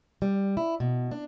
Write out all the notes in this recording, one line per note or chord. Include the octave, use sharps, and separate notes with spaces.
G3
E4
B2
D4